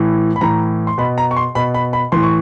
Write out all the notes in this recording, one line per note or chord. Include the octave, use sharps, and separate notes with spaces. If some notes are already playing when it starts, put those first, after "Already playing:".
Already playing: A2 E3
B5
A2 E3 A#5
C6
B2 B5
A#5
C#6
C6
B2 B5
B5
B5
A2 E3 C6
C#6